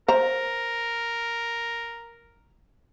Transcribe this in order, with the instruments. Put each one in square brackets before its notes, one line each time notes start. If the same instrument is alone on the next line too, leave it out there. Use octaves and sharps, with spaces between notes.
[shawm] A#4 [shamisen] C5 A#5